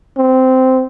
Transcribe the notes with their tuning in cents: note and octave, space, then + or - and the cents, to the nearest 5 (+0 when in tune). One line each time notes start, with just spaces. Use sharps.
C4 -10